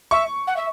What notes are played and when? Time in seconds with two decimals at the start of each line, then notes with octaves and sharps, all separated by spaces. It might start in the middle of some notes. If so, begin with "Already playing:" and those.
0.11 E5 C#6
0.47 F#5
0.56 E5